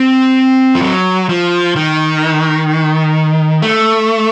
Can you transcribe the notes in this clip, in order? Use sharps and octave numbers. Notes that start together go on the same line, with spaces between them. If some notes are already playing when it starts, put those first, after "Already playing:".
Already playing: C4
F3
F#3
F3
D#3
A3